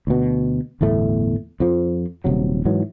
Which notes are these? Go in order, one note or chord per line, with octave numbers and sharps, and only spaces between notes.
D2 B2
G1 E2 A2 A3
F2 F3
D#1 C3 F#3
G#2 E3 F#3